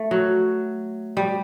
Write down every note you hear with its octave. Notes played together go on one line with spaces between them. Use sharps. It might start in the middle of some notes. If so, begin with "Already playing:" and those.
Already playing: A3
F#3
G3